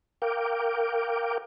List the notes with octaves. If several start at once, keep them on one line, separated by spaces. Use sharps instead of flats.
A#4 F5 G5 D6